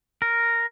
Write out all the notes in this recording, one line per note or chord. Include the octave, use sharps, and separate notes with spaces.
A#4